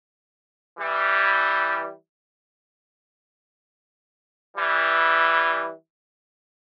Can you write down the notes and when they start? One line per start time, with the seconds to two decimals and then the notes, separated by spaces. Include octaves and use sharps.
0.78 E3 G3
4.56 E3 G3